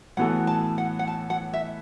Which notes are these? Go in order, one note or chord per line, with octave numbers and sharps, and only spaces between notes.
A2 E3 B3 F#4 A4 F#5
A5
F#5
F#5
A5
F#5
E5